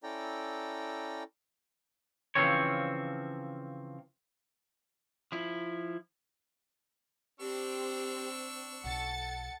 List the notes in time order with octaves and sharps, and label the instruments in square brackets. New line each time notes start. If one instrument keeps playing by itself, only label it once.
[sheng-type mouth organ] C#4 E4 A4 D5 G5 A#5
[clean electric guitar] C#3 E3 F3 C4 C#5
[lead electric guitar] F3 E4
[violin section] C4 [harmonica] D4 C#6 E6 [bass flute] G4
[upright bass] B1 [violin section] A4 A6 C#7 [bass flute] F#5